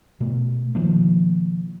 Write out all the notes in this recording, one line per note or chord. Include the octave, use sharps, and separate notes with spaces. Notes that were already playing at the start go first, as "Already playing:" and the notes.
B2 A3
B2 D#3 F3 A#3